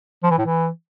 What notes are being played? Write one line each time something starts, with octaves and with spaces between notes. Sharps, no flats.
F3
E3
A2
E3